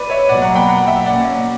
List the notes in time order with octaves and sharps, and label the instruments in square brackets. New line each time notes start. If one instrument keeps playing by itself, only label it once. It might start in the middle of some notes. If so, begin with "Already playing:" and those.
Already playing: [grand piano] B4 D5
C#5 E5
[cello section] B2 F#3 A#3 [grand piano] D5 F#5
[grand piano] F#5 A#5
G5 B5
F#5 A#5
E5 G5
[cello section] B2 A#3 C#4 [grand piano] D5 F#5